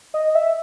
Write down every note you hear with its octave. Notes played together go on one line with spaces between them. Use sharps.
D#5
E5